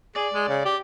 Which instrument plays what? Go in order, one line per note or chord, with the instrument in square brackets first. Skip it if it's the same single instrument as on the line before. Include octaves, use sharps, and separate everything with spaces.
[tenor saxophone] G#4 [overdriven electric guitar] D5
[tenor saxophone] G#3
C#3
G4